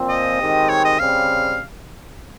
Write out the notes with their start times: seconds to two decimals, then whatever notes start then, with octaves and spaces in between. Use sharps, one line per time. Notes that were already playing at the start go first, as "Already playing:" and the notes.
Already playing: A#2 F3 C4
0.09 D#5
0.39 D#3 G#3 C4 G4
0.69 C#5
0.85 D#5
0.99 C#3 G3 C4 F5